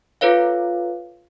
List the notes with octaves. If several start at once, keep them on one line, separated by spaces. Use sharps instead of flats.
F4 A4 B4 C#5 F5